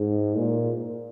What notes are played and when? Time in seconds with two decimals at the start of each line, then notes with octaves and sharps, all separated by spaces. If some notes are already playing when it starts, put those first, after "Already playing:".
Already playing: G#2
0.38 A#2